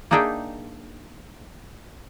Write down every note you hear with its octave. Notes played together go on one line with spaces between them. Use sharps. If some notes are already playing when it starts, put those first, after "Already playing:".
A#3 D4 D#4 G#4 E5 G5